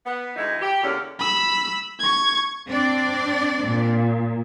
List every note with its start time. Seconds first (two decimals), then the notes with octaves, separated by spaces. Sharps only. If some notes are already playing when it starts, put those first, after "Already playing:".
0.04 B3
0.36 D2 E3 G#3 D#4
0.60 G4
0.81 E2 D3 A#3 C#4
1.19 B5 E6
1.99 C#6 G#6
2.66 C4 D4 D5
3.60 A#2